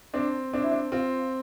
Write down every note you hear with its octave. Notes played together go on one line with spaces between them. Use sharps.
C4 D4
C4 D4
E4
D4
C4 F4